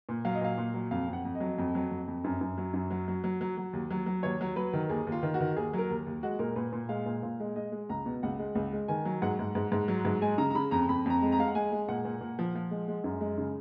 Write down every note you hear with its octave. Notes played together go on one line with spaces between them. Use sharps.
A#2
F#3 F5
D#5
A#2 F5
A#2
F#3
F2 F5
F2 F#5
F2
D#5
F#3
F2
F#3
F2
F2
F#2
F#2
F#3
F#2
F#3
F#3
F#3
F#3
F#3
D#2
F#3
F#3
D#2 C#5
F#3
F#3 B4
D#3
D#2 G#4
D#2
F4
D#3
F#4
D#3
D#2 G#4
F#3 A#4
D#2
D#2
G#3 F#4
A#2 A#4
A#2 B4
A#2
G#3 F5
A#2
A#2 F5
G#3
G#3 D#5
G#3
C#2 A#5
B2
C#2 F#5
G#3
C#2
G#3
D#3 G#5
F#3
G#2 F#5
G#2
G#2
G#2
F#3
G#2
G#3 G#5
C#3 A#5
A#5
C#3 B5
F2 A#5
F2 B5
F2 A#5
G#3
A#5
G#3 F5
F#5
G#3 G#5
G#3
A#2 F#5
A#2
A#2
F3
F3
G#3
G#3
F#2
G#3
C#3